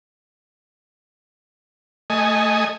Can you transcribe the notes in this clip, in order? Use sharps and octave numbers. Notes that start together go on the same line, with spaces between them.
A3 D#5 G#5